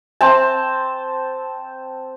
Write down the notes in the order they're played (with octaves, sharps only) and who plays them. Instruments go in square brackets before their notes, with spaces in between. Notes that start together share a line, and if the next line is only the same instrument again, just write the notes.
[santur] C4 A5